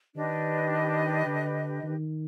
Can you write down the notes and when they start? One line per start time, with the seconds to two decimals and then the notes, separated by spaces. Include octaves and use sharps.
0.15 D#3 D4 G4 B4 D#5
1.27 D3
1.83 D#3